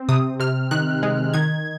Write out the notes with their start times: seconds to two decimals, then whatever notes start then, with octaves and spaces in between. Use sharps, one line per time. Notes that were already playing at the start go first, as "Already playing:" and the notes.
Already playing: C4
0.09 C3 D#6
0.40 C3 F6
0.71 D#3 F#6
1.03 G#3
1.34 D#3 G#6